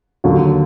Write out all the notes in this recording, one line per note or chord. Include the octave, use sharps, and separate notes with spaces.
D#2 D3 F#3